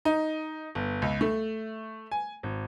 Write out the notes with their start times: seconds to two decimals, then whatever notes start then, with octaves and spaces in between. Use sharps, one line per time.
0.05 D#4
0.75 G1
1.02 C#2
1.21 A3
2.11 G#5
2.43 G#1